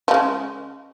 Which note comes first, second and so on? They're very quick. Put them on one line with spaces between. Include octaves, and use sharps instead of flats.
F3 C#3 G#3